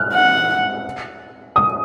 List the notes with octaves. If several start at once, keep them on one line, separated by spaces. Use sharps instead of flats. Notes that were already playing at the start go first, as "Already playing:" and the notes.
Already playing: F6 F#6
F#5
D#6